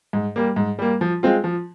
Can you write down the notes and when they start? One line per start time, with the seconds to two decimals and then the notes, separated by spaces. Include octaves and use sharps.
0.13 G#2
0.36 G3 A#3
0.56 G#2
0.79 G3 A#3
1.01 F3
1.23 G#3 C4 F4
1.44 F3